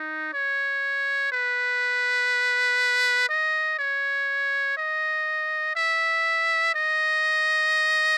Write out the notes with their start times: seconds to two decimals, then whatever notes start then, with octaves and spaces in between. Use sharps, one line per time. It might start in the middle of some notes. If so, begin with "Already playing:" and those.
Already playing: D#4
0.33 C#5
1.32 B4
3.29 D#5
3.79 C#5
4.77 D#5
5.76 E5
6.74 D#5